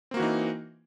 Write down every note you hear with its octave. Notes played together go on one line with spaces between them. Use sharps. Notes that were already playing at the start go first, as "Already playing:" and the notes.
E3 A#3 C4 D#4 F#4